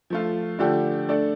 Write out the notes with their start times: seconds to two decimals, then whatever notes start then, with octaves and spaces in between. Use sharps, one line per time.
0.10 F3 A3 F4
0.59 D3 F3 A3 D4 G4
1.09 A3 D4 A4 D5